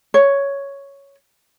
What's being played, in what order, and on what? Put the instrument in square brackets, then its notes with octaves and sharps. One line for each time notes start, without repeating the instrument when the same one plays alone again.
[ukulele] C#5